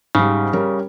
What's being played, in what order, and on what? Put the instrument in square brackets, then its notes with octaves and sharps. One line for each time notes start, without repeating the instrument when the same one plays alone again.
[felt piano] G#2 G3 [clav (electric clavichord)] C#3
[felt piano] G3 C#4 A#4